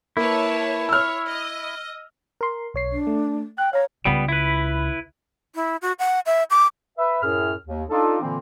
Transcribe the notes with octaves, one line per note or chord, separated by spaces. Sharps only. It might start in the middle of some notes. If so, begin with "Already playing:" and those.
A#3 E4 B4 C#5 A5
C#5 E6 F6
D#5
A#4 C6
B1 C#5 C7
D4
A3
G5 F#6
C#5 F5 A#5
C#2 G3 B3
E4 B4
E4
F#4
F#5
E5
D6
B4 E5
F#2 A2 G#4 F6
D#2
D4 D#4 F4 A4
A#2 D3 E3 A#3 C4